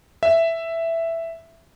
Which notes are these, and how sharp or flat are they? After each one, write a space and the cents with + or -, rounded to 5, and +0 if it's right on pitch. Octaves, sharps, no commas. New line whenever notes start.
E5 +5